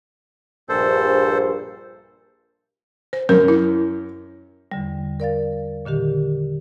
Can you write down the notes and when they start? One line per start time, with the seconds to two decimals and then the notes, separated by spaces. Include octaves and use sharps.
0.69 A#1 G2 A4 C5
3.13 C5
3.29 F#2 A#4
3.48 E4
4.71 E2 D3 G3
5.20 A#4 D5 F5 A6
5.85 A#2 D3 D#3 G4